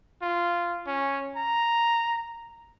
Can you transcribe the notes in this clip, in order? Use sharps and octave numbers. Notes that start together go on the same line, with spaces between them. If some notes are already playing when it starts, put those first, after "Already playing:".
F4
C#4
A#5